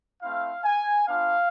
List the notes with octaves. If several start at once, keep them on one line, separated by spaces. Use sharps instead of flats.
A3 C4 E4 F5
G#5
B3 D4 F4 F5